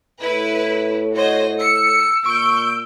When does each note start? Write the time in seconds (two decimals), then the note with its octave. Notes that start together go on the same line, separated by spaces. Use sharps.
0.21 A2 E4 B4
1.14 F#4 C5 C#5 D#5
1.60 E6 C#7
2.25 A#2 C#6 G6 D7